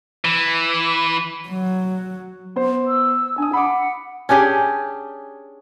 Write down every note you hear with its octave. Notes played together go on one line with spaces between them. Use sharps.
E3
F#3
B3 C5
E6
D4 G#5 D#6
F#5 B5 D6
C#4 D4 G4 G#4